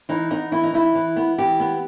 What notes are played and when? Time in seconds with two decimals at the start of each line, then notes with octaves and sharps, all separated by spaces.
0.09 E3 D#4
0.30 B3 D#4
0.52 E3 E4
0.63 D#4
0.74 E3 E4
0.95 E3
1.16 B3
1.38 E3 G4
1.60 B3